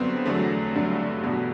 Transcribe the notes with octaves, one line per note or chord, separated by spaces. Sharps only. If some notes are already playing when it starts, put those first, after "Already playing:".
Already playing: G2 D3 F#3 B3 C4
E2 D3 F#3 A3
G2 D3 F#3
E2 B2 F#3 B3